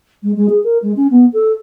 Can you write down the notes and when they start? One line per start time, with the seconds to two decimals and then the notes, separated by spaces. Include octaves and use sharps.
0.23 G#3
0.36 G#3
0.49 G#4
0.64 A#4
0.82 G#3
0.97 C#4
1.11 B3
1.33 A4